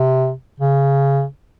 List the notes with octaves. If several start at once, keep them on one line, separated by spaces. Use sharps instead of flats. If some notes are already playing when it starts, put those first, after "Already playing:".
Already playing: C3
C#3